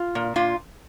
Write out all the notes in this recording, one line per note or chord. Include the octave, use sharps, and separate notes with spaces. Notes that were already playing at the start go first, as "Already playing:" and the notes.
Already playing: F4
A#2
A#2 F4